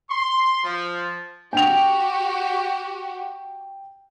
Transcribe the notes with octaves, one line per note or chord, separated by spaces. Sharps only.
C6
F3
F#4 G4 G5 F7